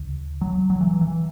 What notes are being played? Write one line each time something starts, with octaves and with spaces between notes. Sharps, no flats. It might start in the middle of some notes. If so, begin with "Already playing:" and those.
Already playing: D2 C#3
F#3
F#3
E3
E3